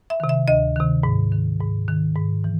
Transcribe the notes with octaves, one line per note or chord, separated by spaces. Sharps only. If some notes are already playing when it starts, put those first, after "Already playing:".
E5
C3 D#3
E5
D2 D#5
C3 D#3
G#2
D#3
G#2
D#3
G#2
E3